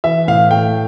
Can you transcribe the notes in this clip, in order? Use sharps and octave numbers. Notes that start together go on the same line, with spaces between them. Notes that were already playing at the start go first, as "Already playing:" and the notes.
E3 E5
A2 F5
A3 G5